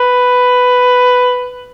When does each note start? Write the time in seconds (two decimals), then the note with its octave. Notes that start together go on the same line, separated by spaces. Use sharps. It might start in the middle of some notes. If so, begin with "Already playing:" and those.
Already playing: B4